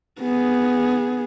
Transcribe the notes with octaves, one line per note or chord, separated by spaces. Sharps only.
B3 G#4